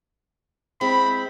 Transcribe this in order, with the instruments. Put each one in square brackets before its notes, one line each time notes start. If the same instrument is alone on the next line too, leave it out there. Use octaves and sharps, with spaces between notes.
[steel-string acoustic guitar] G#3 C4 E4 [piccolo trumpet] B5